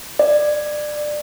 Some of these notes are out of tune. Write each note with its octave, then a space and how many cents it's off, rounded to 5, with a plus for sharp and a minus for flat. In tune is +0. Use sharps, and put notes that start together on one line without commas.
D5 +20